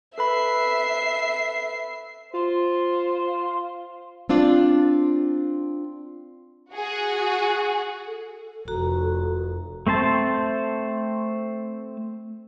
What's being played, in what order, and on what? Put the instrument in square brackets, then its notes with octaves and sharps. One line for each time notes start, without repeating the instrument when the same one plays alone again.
[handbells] A4 B4 B5 [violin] E5 C7
[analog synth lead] F4 [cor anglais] C5
[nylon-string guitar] C4 D4 F4 D5
[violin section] F#4 G#4
[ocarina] A4
[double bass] F1 [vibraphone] F#4 A#5
[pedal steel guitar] A3 C4 C5 A5